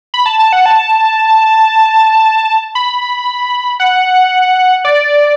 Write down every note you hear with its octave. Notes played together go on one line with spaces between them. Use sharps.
B5
A5
A5
F#5
A5
B5
F#5
D5